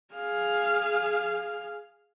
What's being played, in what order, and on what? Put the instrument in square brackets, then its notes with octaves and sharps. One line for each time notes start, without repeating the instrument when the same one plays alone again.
[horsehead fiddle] G#4 F5